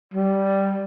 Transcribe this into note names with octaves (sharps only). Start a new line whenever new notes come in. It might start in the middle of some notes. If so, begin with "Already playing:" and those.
G3